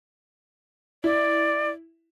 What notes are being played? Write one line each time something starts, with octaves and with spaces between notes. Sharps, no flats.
E4 D5